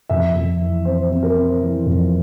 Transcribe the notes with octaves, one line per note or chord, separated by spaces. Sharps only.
F2 E5
F2
E3
C4 C5
C4
A#4
C4
E3
F2